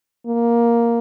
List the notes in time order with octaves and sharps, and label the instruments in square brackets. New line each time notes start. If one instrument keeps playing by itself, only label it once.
[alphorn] A#3